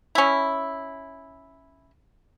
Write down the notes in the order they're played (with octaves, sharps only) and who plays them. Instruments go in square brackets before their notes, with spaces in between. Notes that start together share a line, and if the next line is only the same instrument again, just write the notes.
[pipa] C#4 E4